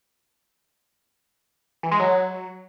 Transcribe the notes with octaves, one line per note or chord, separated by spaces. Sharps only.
E3
G#3
F#3